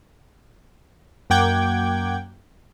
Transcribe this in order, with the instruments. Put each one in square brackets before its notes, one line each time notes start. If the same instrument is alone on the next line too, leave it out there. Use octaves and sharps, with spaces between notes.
[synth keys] F#2 A#3 F#5 G5 D6 G#6